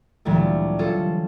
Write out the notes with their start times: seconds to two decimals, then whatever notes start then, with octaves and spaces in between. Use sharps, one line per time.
0.25 D2 A#2 E3 F#3 G3 A3
0.79 C#4 F4 A4 A5